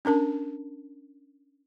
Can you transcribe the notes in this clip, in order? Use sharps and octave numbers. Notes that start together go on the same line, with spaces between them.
C#4 D4 A#4 A5